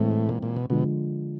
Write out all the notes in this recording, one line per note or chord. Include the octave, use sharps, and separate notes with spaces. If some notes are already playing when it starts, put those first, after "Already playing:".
Already playing: A2 E3 G#3 C4
A#2
A#2
B2
B2 D3 F3 G#3